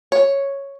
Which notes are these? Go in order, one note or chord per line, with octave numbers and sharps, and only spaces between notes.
C#5